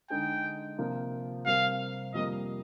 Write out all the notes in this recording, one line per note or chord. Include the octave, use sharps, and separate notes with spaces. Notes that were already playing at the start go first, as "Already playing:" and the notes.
D3 G#3 D#4 G#4 G5
C3 F3 A#3 F4
C3 G3 C4 G4 A#4 F5
F2 C3 G3 A#3 D#5